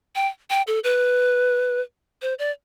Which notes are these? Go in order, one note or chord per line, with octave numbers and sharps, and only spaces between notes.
G5
G5
A4
B4
C5
D5